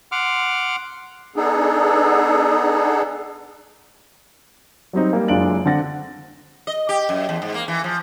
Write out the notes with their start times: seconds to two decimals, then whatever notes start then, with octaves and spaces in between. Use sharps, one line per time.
0.12 F#5 C6 D6 F6
1.36 B3 D4 D#4 G#4 A4
4.93 F#3 G3 C4 D#4
5.13 G3 A#3
5.28 F#1 G#3 D4 F4 D7 F#7
5.65 D3 C4 F#5 A6 A#6
6.67 D#5
6.89 G4
7.09 F#2
7.29 E2
7.42 G#2
7.54 A#3
7.68 E3
7.84 F3